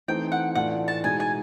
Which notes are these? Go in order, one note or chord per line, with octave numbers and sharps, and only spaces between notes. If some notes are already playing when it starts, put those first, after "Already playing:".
E3 A3 C4 D#4 G5
F#5
A2 E3 A3 D4 F4 F#5
A5
B2 G#3 B3 D#4 G#5
G#5